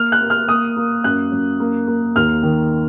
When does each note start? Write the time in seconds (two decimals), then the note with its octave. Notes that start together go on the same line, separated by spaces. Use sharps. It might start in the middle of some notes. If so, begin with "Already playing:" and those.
Already playing: A#3 F6
0.12 F#6
0.21 A#3
0.30 F6
0.48 A#3 D#6
0.76 A#3
1.04 F#2 F#6
1.32 F#2
1.60 A#3
1.87 A#3
2.16 D#2 F6
2.43 D#3